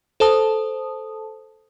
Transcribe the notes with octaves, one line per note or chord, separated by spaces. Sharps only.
A4 C5 A5 D#6